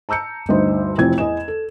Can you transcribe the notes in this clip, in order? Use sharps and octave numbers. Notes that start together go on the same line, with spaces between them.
A5 A#5 E6 G6 C#7
D2 G2 D#4 C5
F1 E3 F3 C4 G#6
E2 D#5 G#5 E7
A4